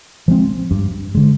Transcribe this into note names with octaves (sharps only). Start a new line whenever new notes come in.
F3 G#3 C4
G2
D3 G#3